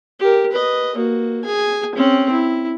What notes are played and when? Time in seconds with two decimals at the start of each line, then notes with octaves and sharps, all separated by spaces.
0.20 G4 A#4
0.52 B4 D#5
0.95 A#3 F#4
1.44 G#4 G#5
1.95 C4 C#4
2.32 E4